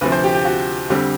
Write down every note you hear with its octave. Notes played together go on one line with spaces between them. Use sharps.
D2 C3 F3 B4
C5
G4
G4
F#4
F2 D3 G3 C4